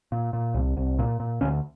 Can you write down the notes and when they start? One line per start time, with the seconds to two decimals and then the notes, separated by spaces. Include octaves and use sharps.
0.12 A#2
0.33 A#2
0.55 C2
0.77 C2
0.99 A#2
1.20 A#2
1.41 D2 C#4